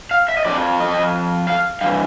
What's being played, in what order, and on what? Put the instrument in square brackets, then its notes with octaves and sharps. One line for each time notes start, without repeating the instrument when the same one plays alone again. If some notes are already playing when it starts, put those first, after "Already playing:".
[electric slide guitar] F5
E5
D#5
F2 C3 F3 D5
D#5
F5
G2 F5
E3